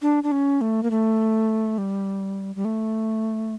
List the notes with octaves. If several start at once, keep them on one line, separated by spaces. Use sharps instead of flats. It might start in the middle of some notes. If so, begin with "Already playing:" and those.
D4
D4
C#4
A3
A#3
A3
G3
G3
A3